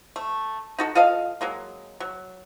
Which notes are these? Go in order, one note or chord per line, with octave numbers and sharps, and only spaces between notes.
A3
D#4 F#4 A4
F4 A4 D#5 F5
F#3 G#3 A#3
F#3